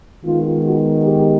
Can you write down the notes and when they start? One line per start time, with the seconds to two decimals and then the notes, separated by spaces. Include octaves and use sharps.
0.24 D#3 G#3 B3 F4
0.64 F#4
1.03 G4